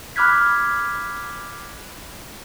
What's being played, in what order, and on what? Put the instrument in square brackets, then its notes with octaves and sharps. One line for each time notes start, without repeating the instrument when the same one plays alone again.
[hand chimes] B5 D6 F6 F#6 G#6 B6